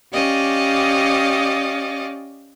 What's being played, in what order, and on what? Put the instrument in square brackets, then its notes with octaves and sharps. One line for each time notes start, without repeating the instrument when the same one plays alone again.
[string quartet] C#4 G4 D5 D#5 F5